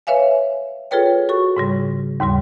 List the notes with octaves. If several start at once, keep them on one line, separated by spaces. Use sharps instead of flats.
B4 C#5 E5 F5 G#5
F4 G#4 A4 B4 C#5 G5
F#4 A4 C#6
G#2 C#3 G3
D#2 G#2 C#3 G3